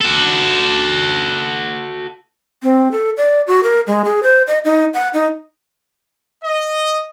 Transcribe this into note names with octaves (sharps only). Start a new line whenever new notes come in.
F#4 A4
C4
A4
D5
F#4
A#4
G#3
G#4
C5
D#5
D#4
F#5
D#4
D#5